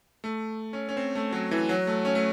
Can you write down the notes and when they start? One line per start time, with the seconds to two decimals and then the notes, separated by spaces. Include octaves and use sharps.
0.24 A3
0.73 C#4
0.89 C#4
0.97 C4
1.15 A3
1.32 F#3
1.51 E3
1.69 F#3
1.87 A3
2.05 C#4
2.15 A3